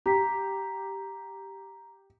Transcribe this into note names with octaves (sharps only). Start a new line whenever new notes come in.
G4 A#5 B6